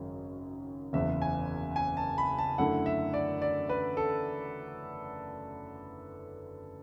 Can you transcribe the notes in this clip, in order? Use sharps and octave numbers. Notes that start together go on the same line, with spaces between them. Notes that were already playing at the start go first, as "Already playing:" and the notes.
Already playing: G#1 F#2 C#3
F#1 E2 C#3 E5
G#5
G#5
A5
B5
A5
F#2 D3 A3 E4 F#5
E5
D5
D5
B4
A4